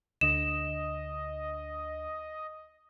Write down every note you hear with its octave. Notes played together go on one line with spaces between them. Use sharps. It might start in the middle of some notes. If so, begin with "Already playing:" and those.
D2 D3 D#5 E7